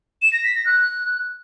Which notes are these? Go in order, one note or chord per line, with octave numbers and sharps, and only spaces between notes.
E7
A#6
B6
A#6
F#6